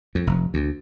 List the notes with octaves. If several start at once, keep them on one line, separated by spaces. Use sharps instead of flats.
F2
F1
D2